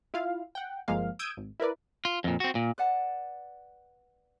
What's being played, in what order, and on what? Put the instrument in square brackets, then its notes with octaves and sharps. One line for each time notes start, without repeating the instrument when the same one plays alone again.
[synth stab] E4 F4 F5
F#5 G5
G1 F3 G#3 A#3 F5
D#6 E6 G6 G#6 D7 D#7
G#1
E4 A#4 B4 D5
[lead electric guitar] F4
F2 A#2
C4 F#4
A#2
[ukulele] B4 D5 F#5 A5